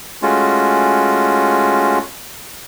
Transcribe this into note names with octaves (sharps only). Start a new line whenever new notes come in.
G#3 A3 C#4 F4 F#4